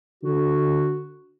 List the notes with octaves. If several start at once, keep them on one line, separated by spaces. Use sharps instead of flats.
D3 F#4